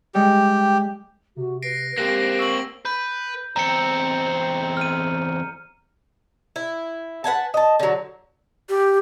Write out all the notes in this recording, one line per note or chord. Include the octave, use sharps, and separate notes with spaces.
G3 G#3 G4
C3 F#4
B4 A#6 C7 D7
A#3 C4 G4 F#6 A#6
C#6 E6 F#7
B4 G6
E2 C4 A#5 C#7
F6 D#7
E4
B4 F#5 G#5 A5
D#5 A5
D3 F#3
G4